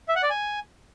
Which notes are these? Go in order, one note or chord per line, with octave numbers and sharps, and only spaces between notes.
E5
F#5
D5
G#5